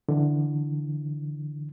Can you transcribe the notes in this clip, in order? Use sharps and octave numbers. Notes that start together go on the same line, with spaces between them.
D3 E3